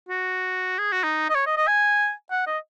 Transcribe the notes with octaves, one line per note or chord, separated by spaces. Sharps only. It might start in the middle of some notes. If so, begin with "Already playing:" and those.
F#4
G#4
F#4
D#4
D#5
C#5
D#5
D#5
G#5
F#5
D#5